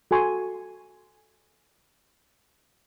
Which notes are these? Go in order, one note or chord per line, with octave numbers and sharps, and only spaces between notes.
F#4 A4 G#5 C6 C#6